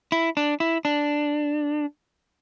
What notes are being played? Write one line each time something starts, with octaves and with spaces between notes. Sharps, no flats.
E4
D4
E4
D4